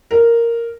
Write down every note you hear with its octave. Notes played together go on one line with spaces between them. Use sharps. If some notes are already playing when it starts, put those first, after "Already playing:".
A#4